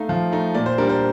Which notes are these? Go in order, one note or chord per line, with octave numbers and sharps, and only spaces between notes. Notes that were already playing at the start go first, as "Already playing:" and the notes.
Already playing: A3 D#4 F5
F3
A3 D#4
A#2 D5
C5
G3 D4 A#4
C5